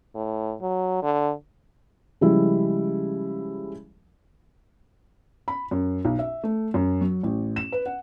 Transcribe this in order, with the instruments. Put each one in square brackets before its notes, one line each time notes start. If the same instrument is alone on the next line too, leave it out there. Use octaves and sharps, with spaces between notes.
[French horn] A2
F#3
D3
[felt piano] C#3 F3 G3 G#3 E4
B5
F#2
B1
E5
A3
F#2
F#3
A1
E7
B4
F#5